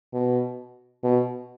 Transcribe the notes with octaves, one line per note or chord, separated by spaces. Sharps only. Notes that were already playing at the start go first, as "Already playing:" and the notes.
B2
B2